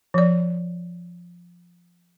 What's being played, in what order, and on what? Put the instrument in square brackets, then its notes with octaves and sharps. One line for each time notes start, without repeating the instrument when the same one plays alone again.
[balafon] F3 D5